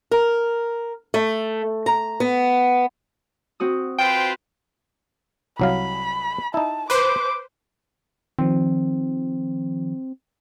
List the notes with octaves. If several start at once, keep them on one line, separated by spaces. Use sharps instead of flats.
A#4
A3
A#5
B3
C4 F#4 D#6
F4 B4 C5 G5
C2 F#3 F5 B5
D#4 E4 A5
B4 C5 D6
D#3 F3 C4